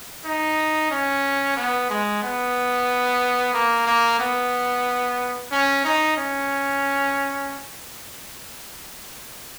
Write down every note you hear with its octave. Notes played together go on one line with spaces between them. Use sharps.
D#4
C#4
B3
G#3
B3
A#3
A#3
B3
C#4
D#4
C#4